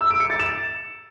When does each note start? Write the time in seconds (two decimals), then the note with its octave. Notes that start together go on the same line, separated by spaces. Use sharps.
0.01 E6
0.10 D7
0.20 C#7
0.30 A6
0.39 E7